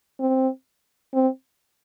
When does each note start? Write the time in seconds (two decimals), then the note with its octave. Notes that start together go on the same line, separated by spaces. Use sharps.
0.20 C4
1.14 C4